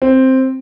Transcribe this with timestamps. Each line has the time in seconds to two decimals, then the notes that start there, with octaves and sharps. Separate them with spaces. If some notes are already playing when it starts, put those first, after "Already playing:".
0.02 C4